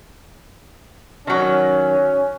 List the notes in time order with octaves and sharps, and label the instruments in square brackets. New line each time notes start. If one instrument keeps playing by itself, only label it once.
[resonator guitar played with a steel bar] D#3 F#3 [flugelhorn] C#4